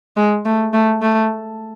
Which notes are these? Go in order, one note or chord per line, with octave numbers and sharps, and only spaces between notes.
G#3
A3
A3
A3